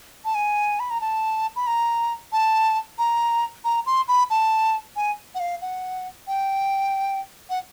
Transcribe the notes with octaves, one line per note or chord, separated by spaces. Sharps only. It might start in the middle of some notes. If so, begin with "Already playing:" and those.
A5
G#5
B5
A#5
A5
B5
A#5
A5
A#5
A#5
C6
B5
A5
G#5
F#5
F5
F#5
G5
F#5